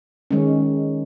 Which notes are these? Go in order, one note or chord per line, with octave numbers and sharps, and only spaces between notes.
D#3 G#3 C#4